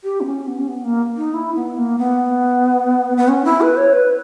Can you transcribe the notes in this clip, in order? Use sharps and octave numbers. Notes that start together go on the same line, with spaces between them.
G4
B3
C#4
B3
C#4
B3
A#3
D#4
E4
B3
A#3
B3
B3
C#4
E4
B4
C#5
B4